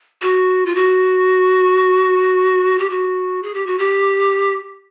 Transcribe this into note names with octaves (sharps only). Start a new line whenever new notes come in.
F#4
F4
F#4
G4
F#4
G#4
G4
F#4
G4